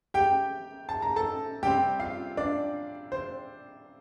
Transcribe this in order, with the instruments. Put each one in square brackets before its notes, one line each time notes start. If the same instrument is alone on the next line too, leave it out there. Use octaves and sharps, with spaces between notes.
[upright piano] G4 G5
A5
A#5
A4 A5
C3 G3 C4 G4 G5
F4 F5
D4 D5
C5